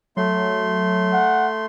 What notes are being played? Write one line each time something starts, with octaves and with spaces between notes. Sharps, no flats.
F#3 A3 C6
F#5